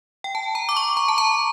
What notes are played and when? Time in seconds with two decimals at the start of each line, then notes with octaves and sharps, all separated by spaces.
0.24 G5
0.35 A5
0.55 A#5
0.69 D6
0.77 C#6
0.97 A#5
1.08 A5
1.18 A#5